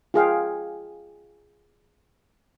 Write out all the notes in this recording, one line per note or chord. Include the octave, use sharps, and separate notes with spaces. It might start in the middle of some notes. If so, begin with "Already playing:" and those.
F4 G#4 F5 G5